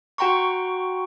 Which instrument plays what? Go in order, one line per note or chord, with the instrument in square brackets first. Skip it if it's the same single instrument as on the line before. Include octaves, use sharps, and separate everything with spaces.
[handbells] F#4 F#5 G5 A#5 C6 C#6